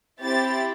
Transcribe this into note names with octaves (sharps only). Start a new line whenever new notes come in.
C4 E4 G4 A6